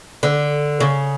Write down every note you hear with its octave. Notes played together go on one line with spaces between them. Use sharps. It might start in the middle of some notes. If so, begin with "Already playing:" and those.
D3
C#3